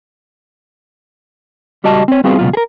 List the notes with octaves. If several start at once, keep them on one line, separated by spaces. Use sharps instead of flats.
C#2 G3 F#4 D#5 A5
C4 C#5
G3 B3 C4 F4 F#4 G#4
C#2 G2 B2 F#3 F4
G#4 A#4